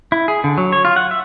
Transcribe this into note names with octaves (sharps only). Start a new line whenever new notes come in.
E4
G#4
D3
F#3
C#5
F4
F#5
E5